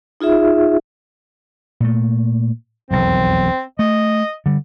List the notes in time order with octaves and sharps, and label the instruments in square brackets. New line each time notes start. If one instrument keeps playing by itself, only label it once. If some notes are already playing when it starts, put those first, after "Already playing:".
[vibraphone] D#4 F4 G#4 E5
[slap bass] A#2 A3
[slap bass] E1 B1 F2 [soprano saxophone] C4
[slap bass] A3 [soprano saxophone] D#5
[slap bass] D3 G3